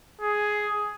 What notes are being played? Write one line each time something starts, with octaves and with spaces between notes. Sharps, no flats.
G#4